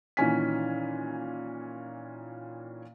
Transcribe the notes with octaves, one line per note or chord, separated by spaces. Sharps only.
A#2 D#3 E3 C#4 G#5 B6